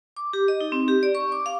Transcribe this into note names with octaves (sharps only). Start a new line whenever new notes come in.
D6
G4
D#5
D#4
C4
G4
D5
C#6
D6
F5